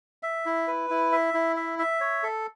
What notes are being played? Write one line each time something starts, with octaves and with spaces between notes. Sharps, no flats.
E5
E4
B4
E4
E5
E4
E5
E5
C#5
A4